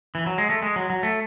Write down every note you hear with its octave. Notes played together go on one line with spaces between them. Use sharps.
E3
F#3
G#3
A3
G#3
F#3
F#3
A3